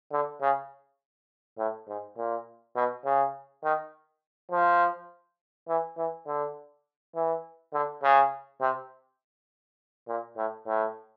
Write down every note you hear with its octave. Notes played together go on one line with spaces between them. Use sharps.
D3
C#3
A2
G#2
A#2
B2
C#3
D#3
F3
E3
E3
D3
E3
D3
C#3
C3
A#2
A2
A2